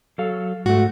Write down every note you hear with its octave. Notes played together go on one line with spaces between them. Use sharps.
F#3 A4 F5
G#2 A3 F#4